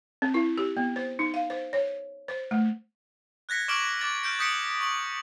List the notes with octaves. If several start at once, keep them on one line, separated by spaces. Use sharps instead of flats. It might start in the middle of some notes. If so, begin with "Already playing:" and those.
C4
E4
G4
B3
C5
D#4
F5
C5
C#5
C5
A3
F#6 G#6 A#6 B6 C#7
C#6 D6 F6 D7 E7 F#7
D6 A6 F#7
F6 G6 D7
D#6 G6 B6 C#7 D7 F#7
C#6 D7 F#7